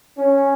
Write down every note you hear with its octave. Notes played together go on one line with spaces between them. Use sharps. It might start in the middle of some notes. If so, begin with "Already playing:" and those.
C#4